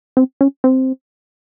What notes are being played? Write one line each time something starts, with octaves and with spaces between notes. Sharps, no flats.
C4
C#4
C4